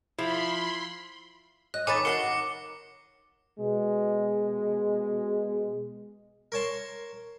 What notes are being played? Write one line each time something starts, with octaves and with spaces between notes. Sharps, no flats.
F3 E4 B5 C6
D#5 F#6
D#3 B3 D#4 A4 C#5 G#5 D6 A6
F#4 A#4 F#5 C7 C#7 G7
D#3
B2 G#3
A#4 C#5 A5 C6